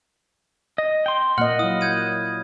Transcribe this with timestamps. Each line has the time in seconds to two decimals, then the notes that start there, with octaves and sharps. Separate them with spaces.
0.78 D#5
1.06 G5 C6
1.38 A#2 A#3 D#5 F#5 F6
1.59 F#3 E4 D#6
1.81 G6 G#6 D#7